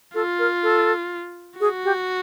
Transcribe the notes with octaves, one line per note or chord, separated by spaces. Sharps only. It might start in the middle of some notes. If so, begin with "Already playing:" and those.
F4 A4
A#4
A4
F#4 G#4
G4